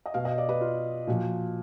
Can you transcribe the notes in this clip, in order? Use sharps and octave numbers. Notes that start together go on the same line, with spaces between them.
D#5
B2 F5
D#5
D5
B4
F4
A#2 F3 F#4